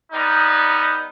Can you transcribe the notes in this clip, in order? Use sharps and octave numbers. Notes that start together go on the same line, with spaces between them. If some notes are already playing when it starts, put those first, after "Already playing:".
G3 B3 D#4